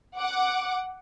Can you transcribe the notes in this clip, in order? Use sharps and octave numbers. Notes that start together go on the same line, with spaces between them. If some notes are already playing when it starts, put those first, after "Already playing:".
F#5 D6